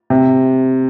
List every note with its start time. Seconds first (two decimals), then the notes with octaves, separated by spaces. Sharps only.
0.10 C3